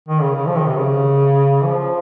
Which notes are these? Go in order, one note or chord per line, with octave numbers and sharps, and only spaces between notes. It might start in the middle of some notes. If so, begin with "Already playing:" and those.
D#3
C#3
C#3
F3
D#3
C3
C#3
F3